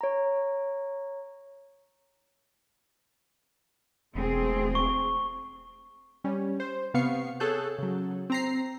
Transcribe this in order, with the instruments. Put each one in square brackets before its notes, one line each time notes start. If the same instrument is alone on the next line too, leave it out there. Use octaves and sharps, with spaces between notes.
[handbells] C#5 A#5
[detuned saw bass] E1 [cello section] A3 C4 G#4
[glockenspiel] C#6
[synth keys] G3 C#4
C5
C3 B3 F5 C#6 C7 C#7
G#4 A4 C#5 A5 F#6 G6
C#3 F#3
C4 A#5 C7